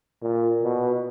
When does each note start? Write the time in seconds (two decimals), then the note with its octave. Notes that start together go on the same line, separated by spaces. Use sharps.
0.22 A#2
0.63 B2